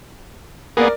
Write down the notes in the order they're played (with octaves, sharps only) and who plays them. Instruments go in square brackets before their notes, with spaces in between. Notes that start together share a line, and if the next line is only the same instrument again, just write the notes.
[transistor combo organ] A#3 B3 G#4 [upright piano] A#4 D5